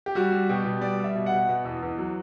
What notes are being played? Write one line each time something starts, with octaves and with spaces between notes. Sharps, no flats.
G4
G3 F#4
G3
B2 G4
B2
G3 D5
G3 E5
B2
F#5
B2
B2
E2
E2
F#3